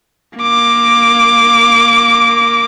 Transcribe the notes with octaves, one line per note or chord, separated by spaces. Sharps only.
A#3 D6